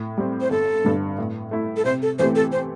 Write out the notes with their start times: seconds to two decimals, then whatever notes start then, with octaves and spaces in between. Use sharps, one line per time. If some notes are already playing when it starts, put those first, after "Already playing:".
Already playing: A2
0.18 G3 C4
0.41 C5
0.50 G1 A4
0.85 G2 D3
1.18 A2
1.51 A3 E4
1.77 A4
1.85 C3 C5
2.02 A4
2.19 E3 A3 C4 G4 C5
2.35 A4
2.52 C5